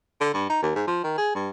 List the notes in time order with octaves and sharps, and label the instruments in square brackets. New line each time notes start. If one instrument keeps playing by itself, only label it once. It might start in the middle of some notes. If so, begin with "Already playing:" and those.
[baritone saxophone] D3
G2
D#4
D#2
G#2
F3
D#3
G#4
G2